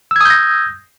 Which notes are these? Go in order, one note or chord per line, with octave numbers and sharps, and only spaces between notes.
D#6 E6 G6 G#6 A#6